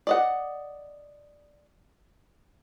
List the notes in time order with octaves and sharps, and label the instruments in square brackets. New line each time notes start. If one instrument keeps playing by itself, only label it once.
[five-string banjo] D5 D#5 F#5